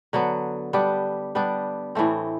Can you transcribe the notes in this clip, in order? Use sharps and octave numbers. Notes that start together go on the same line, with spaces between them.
D3 F#3 B3
G3 B3 D4 G4
G3 B3 D4 G4
A2 E3 A3 C4